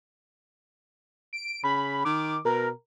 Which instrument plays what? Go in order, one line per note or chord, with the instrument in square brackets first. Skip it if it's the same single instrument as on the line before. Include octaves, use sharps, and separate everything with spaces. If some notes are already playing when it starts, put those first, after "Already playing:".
[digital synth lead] D7
[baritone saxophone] C#3 [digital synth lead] B5
[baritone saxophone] D#3 [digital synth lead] D6
[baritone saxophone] B2 [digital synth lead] A#4